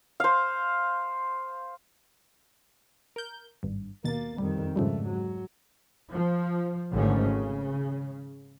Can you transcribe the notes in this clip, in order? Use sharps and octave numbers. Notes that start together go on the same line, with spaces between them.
C5 F5
A#4 G6
G#1 G2
D#2 B2 A#3 A6
F2 D#3 G3
G#2 C#3 F3 G3 A3
F#3
F3
G#1 G#2 D3 F3 A3 C#4
C#3